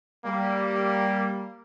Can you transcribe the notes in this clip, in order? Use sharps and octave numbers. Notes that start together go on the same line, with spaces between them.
G3 A#3